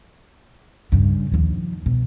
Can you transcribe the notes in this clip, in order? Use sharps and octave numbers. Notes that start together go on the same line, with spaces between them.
G2 C#3
D#2 F3
B2